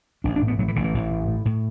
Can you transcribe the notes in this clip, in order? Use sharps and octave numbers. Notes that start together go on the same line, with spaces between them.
A1 D4
D4
A2
B3
A2 F#3
E3
A1 D3
E3
A1
A2
A2
A2